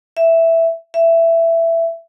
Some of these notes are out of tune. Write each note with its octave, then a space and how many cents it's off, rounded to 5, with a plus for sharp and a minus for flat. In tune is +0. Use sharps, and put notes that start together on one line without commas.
E5 +0
E5 +10